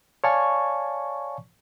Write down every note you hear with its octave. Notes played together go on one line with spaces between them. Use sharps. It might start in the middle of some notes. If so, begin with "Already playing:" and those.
C#5 D5 F5 G#5 A5 C#6